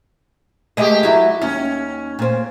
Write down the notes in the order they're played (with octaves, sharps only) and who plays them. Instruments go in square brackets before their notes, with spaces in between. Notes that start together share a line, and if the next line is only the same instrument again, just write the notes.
[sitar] A#2 A3 G4 [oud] G#3 D#5
[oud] F#3 E4
[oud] D#2 [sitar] C#4
[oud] A#2 C4